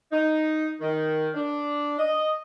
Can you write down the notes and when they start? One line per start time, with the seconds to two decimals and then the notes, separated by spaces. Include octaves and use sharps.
0.11 D#4
0.81 D#3
1.34 D4
1.98 D#5